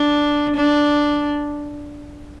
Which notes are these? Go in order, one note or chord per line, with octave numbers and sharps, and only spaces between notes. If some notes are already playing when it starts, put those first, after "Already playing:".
Already playing: D4
D4